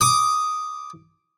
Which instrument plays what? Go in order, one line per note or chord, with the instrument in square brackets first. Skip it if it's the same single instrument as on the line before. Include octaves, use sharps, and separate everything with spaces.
[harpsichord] D6 D#6